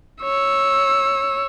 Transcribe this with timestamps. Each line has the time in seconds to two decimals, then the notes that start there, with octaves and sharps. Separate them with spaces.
0.23 C#5 E6